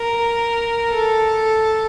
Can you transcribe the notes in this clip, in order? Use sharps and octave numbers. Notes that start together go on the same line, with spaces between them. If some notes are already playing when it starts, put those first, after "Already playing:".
Already playing: A#4
A4